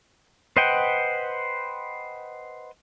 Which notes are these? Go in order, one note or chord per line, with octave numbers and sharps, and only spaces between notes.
B4 C5 D#5 F#5 G5